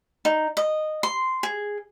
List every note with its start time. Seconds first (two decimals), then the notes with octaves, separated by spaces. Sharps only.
0.25 D#4
0.57 D#5
1.03 C6
1.43 G#4